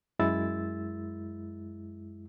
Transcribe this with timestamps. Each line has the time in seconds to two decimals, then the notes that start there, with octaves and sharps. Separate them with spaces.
0.19 F#2 G#3 E4 E6 A6